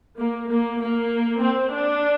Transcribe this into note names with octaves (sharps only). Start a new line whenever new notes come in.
A#3
A#3
A#3
C4
D4